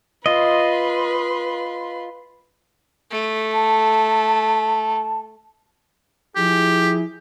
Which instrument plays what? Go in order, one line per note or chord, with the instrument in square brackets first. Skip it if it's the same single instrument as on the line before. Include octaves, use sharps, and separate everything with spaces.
[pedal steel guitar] F4 D#5 [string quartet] B4 C6
[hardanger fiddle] A3
[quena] A5
[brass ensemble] F3 E4 G#4 [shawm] G4